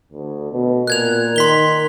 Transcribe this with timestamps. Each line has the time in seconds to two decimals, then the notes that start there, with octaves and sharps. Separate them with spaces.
0.12 D2
0.52 B2
0.87 A#2 F#6 G#6 F7
1.36 D#3 C6 B6 G7